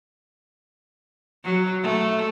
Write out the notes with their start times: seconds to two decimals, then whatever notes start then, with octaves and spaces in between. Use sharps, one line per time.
1.44 F#3
1.82 A3